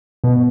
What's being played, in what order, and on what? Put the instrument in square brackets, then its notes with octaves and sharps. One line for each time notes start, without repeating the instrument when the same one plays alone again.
[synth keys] B2